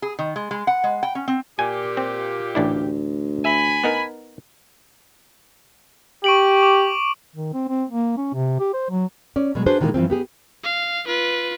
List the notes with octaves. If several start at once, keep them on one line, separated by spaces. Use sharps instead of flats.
G#4
D#3
G#3
G#3
F#5
G#3
G5
C#4
C4
A#2 G4 G#5
C4
A1 D2 D4 E4
E5 G#5 B5
B3 D#4 A#4
G4 C#6 D7 F#7
D6
D#3
C4
C4
A#3
C#4
C3
G4
C5
F#3
C#4 D5
B2 F#3 G#3
D4 F#4 G#4 B4 C5
A#2 D#3 E3 F#3 G#3 A#3
G2 E3 F3 C4
B3 G4 G#4
F5
F4 B4